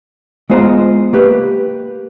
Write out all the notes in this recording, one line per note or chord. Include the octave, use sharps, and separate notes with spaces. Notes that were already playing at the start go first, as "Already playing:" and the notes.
G#3 B3 F4 C5 D#5 A#5
A#3 G4 B4